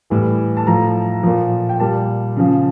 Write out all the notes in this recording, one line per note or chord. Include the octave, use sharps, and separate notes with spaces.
A2 E3 G3
A5
A2 F3 A#5
A#2 F3
G5
A#2 G3 A5
C#3 F3